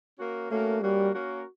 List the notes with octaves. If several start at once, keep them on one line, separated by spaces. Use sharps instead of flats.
A#3 C#4 F#4 A#4
A3 A#3 C#4 F#4 A#4
G3 A#3 C#4 F#4 A#4
A#3 C#4 F#4 A#4